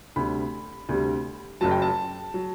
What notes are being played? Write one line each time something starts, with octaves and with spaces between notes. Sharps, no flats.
D2 C3 G3 B5
D2 C3 G3
F#1 F#2 F#3 A5
G5
A5
F#3